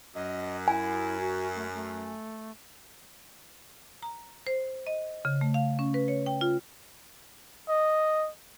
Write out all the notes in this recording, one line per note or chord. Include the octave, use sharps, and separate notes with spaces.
F#2 D#5
E4 G#5
F#4
A3
A3
A#5
C5
D#5
C#3
A3
F5
C#4
B4
C#5
G5
F4
D#5